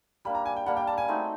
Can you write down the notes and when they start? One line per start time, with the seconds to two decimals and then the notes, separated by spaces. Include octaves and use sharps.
0.25 G3 A#3 D4 B5
0.35 A#5
0.46 G#5
0.56 G5
0.66 G3 A#3 D4 F#5
0.77 G5
0.87 A5
0.98 G#5
1.08 A3 C4 D#4 F#4